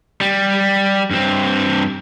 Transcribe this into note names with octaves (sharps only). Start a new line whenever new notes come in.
G3
G2 C4